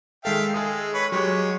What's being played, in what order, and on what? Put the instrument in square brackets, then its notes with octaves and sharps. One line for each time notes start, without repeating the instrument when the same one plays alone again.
[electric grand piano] D#3 G#3 A4 [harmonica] E5 F5 G5
[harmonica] G#3 [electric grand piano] G#4 A4 D#6
[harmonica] B4 C#5
[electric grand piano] F#3 G4 [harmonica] G#3 C#5